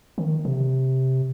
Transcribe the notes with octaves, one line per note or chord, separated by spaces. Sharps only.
D#3
C3